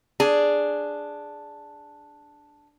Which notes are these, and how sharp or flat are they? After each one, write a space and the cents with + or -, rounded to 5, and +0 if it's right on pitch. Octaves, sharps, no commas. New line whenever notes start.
D4 +0 G#4 +0